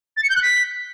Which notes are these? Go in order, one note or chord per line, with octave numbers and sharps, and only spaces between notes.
A6
C#7
G6
F#6
B6